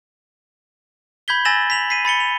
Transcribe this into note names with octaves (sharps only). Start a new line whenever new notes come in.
B5 G6 G#6 B6 G7
G#5 E6 A6 A#6 E7 F#7
B6 F7 F#7
B6 C7 D#7
B5 A6 C#7 G7
F7